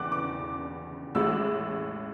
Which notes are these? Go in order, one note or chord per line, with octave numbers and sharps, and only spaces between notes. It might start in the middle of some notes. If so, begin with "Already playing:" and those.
Already playing: E2 C#3 E3 D6 F#6
D6
A1 A2 G#3 E6